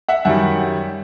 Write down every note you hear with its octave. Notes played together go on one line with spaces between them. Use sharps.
E5 F#5
F#2 D#3 G3 E5 F#5